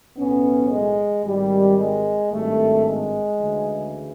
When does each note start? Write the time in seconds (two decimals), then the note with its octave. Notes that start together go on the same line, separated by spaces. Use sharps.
0.16 B1 A2 E3 B3 C#4
0.70 G#3
1.24 G#1 G#2 D#3 G3
1.78 G#3
2.31 G#1 G2 D#3 G3 A3
2.84 G#3
3.38 D2 C#3 E3